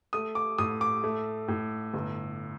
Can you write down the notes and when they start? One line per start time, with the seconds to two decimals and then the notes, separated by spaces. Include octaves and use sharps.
0.13 A3 D#6
0.35 D6
0.58 A2 D#6
0.81 D6
1.04 A3
1.48 A2
1.94 G1